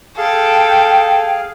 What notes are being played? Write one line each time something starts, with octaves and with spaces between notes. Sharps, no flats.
G#4 A4 F5 G5